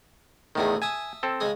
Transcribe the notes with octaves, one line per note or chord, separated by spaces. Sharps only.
E2 A2 D#3 C4 G#4
E5 G#5 A5 D#6
C4 A4
C#3 G#3 G#4